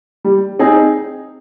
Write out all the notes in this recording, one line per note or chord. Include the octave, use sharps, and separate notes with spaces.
G3
C4 D#4 G#4